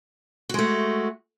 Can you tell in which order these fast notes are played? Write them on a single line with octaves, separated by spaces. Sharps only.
F#4 G#3 A3